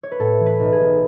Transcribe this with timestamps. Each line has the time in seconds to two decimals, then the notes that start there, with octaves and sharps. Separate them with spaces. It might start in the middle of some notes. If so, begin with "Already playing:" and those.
0.03 C#5
0.11 B4
0.19 A2 A4
0.40 E3
0.46 B4
0.60 B1
0.72 G#4
0.79 B1